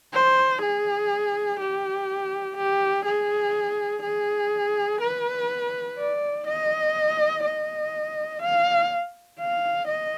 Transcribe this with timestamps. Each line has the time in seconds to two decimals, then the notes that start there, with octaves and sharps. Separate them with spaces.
0.14 C5
0.62 G#4
1.60 G4
2.57 G4
3.06 G#4
4.03 G#4
5.01 B4
5.98 D5
6.47 D#5
7.44 D#5
8.42 F5
9.40 F5
9.87 D#5